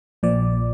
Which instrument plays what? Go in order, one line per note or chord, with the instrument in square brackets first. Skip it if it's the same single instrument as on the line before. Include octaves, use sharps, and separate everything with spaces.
[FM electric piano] A#1 A#2 F3 D5